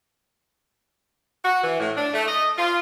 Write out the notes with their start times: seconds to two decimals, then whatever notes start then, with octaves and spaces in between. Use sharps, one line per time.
1.44 F#4
1.63 E3
1.80 A2
1.96 D4
2.13 A3
2.28 D#5
2.58 F4